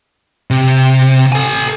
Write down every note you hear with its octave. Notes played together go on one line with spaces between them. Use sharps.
C3
A4 G#5